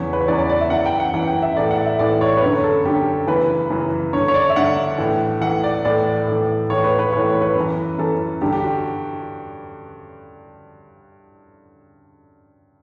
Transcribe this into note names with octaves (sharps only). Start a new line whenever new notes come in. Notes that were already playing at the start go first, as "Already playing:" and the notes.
Already playing: E2 C#3 E3 C#5
B4
C#5
E2 C#3 E3 D5
D5
D5
E5
F#2 E3 F#5
G5
F#5
F#2 E3 F#5
G5
E5
A2 E3 D5
F#5
E5
A2 E3 D5
C#5
B4
F#2 D3 C#5
A4
F#2 D3 G4
F#2 C#3 E3 B4
F#2 C#3 E3
G2 D3 C#5
C#5
D5
E5
G2 D3 F#5
A2 E3
A2 E3 F#5
D5
A2 E3 D5
A2 E3
A2 E3 C#5
B4
B4
A2 E3 C#5
C#5
B4
F#2
E3
F#2 E3 A4
G2 D3 G4
G4
F#4